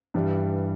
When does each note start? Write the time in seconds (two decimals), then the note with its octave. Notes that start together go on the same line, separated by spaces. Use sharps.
0.14 G2 E3 G3